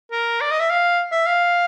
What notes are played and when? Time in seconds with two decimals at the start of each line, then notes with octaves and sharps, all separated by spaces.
0.12 A#4
0.41 D5
0.51 D#5
0.60 E5
0.70 F5
1.12 E5
1.26 F5